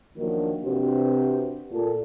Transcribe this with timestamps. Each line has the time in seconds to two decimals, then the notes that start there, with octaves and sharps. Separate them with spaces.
0.17 E2 D#3 F3 F#3 A#3 D4
0.64 C3 D4 F#4 G4 B4 C5
1.72 A#2 A4